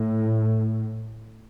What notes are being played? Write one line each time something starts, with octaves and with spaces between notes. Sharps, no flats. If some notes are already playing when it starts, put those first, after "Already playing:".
Already playing: A2